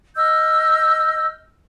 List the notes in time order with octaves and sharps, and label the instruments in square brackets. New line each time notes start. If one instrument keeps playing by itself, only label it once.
[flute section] D#5 E6 F6 G6